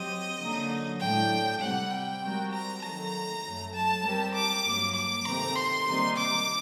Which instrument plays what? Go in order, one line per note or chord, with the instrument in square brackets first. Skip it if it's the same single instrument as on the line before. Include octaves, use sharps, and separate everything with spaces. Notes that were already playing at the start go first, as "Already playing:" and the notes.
Already playing: [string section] F#3 C4 G4 [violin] D#5
[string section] D3 F#3 A#3 D#4
[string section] A2 F#3 A3 D4 [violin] G5
[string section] C3 G3 C4 [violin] F#5
[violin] G5
[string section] G3 C4 F#4 A#4
[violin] A#5
[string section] D#3 F#3 A3 [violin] A#5
[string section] F#2 F#3 A3
[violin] A5
[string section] G3 C4 G4 A#4
[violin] D6
[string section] G2 F#3 A#3
[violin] D6
[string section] C3 D#3 A3 C4 [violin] A#5
[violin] C6
[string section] C3 D#3 G3 A#3 D#4
[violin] D6